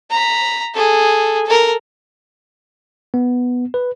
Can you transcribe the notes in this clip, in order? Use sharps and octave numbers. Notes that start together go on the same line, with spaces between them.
A#5 B5
G#4 A4
A4 A#4
B3
B4